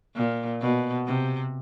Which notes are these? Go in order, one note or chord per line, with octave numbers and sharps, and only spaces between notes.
A#2
B2
C3